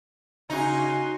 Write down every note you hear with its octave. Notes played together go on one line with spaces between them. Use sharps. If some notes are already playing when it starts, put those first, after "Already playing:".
C#3 C#4 D#4 F#4 G#5 C6 C#6